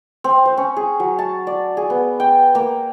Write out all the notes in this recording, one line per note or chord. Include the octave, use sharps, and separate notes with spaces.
C4
C5
C#4
G#4
F#3
A5
D5
G#4
B3
G5
A#3